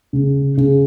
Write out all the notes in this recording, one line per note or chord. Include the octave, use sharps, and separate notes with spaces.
C#3
C#3